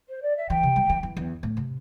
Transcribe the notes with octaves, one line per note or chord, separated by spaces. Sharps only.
C5
D5
E5
E3 G5
C3
G3
E3
E3
E2
A2
C3